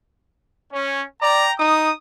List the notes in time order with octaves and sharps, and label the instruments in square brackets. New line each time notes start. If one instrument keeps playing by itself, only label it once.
[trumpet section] C#4
[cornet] D5 [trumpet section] G5 A#5
[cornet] D#4 [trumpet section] D#6